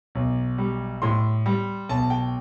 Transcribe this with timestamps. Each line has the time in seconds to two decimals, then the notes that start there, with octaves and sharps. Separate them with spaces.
0.15 B1
0.58 G3
1.02 A2 C6
1.46 G3
1.89 B1 A5
2.10 G5